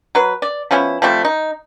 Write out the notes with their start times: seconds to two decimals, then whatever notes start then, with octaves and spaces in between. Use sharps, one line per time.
0.15 F#3 B4
0.42 D5
0.71 F3 B3 C#4 E4
1.02 F3 G3 A3 C4
1.25 D#4